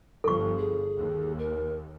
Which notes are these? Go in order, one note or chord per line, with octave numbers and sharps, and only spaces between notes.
G1 G2 F3 A4 C#6
G#4
D#2
A#4